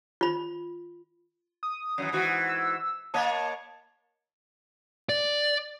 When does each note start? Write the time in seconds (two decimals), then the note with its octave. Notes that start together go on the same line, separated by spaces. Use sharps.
0.21 F4 B5
1.63 D#6
1.98 F#2 D3 E3
2.12 G#2 E3 F#4
2.49 E6
3.14 A#3 C#5 D#5 A5
5.09 D5